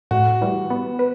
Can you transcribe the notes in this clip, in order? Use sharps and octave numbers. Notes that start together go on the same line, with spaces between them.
A2 F#4
E3 G3
B3
B4